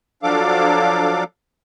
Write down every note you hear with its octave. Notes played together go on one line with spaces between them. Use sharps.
F3 F#3 D4 A4 F5 D6